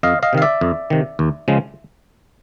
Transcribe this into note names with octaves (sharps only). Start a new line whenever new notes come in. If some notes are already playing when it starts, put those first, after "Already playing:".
F2 D#5 F5
D#5 F5
C3 D#3 F5
D5 E5
F2
C3 D#3
D#2
C#3 F3 G#3